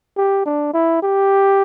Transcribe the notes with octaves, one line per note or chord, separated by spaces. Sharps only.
G4
D4
E4
G4